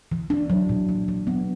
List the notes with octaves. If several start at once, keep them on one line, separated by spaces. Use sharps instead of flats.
E3
D4
F#3
A#2
F#3
F#3
B3